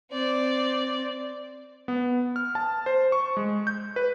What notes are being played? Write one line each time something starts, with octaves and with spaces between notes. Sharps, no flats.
C4 D5
B3
F6
A5
C5
C#6
G#3
G6
B4